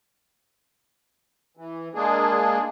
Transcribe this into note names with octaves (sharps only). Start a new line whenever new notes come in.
E3
G#3 A#3 D4 G#4